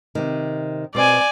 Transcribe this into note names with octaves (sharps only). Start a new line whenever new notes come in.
C3 D#3
B2 C4 D5 G#5